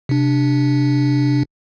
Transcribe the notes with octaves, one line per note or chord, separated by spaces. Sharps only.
C3 D4